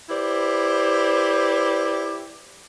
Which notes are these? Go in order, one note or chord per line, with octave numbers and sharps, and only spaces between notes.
E4 G4 B4 C5 D5